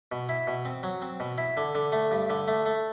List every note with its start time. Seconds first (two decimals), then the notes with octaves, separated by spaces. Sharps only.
0.12 B2
0.29 E4
0.47 B2
0.65 C4
0.83 F#3
1.02 C4
1.20 B2
1.38 E4
1.57 D3
1.75 D3
1.92 A3
2.11 G2
2.30 D3
2.48 A3
2.66 A3